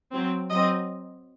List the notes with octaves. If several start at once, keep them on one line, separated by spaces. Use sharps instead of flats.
F#3 C4
F#3 C4 D#5